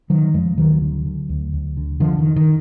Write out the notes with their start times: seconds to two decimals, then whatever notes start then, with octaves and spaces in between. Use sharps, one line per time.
0.10 D3 D#3 F#3
0.34 F2 F3 G#3
0.58 D2 D#3 F#3
0.82 D3
1.05 D3
1.29 D2
1.53 D2
1.77 D3
2.00 F2 D3 F3
2.19 D#3
2.24 D3
2.36 D#3